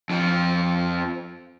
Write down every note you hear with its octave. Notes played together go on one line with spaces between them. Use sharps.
F2 F3